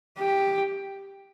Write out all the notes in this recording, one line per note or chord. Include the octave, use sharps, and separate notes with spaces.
G4